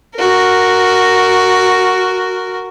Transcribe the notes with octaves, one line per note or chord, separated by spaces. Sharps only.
F#4 A#4